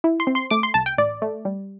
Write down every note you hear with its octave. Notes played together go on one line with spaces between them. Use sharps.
E4
C6
C4
C6
A3 D6
C6
C2 A5
G5
A1 D5
A3
G3